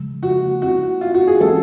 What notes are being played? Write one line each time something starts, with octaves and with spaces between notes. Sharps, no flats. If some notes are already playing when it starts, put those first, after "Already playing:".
Already playing: C#3 F3 G#3
F#4
A3 C4 E4 F#4
F4
F#4
G#4
E3 G#3 C#4 F4 A4